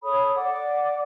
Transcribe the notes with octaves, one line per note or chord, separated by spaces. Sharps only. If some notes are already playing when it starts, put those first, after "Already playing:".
A4 C#5 B5 D#6
D5 F#5 D6